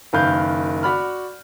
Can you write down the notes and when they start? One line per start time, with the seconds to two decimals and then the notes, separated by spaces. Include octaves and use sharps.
0.13 F#1 D#3 B4 F5 G6
0.83 F#4 D5 B5 F6